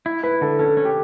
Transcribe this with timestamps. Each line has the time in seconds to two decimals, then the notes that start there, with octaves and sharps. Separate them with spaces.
0.06 E4
0.23 E4 B4
0.41 D3 A4
0.59 C#4 A4
0.77 C#4
0.85 G4